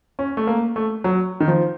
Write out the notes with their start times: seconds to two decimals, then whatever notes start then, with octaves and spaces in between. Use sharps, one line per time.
0.19 C#4
0.37 A3
0.47 A#3
0.76 A3
1.04 F#3
1.40 D#3
1.48 F3